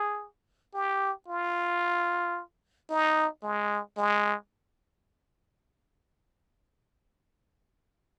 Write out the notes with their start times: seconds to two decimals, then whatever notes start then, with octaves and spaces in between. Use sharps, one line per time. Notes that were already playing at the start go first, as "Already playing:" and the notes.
Already playing: G#4
0.74 G4
1.28 F4
2.90 D#4
3.43 G#3
3.97 G#3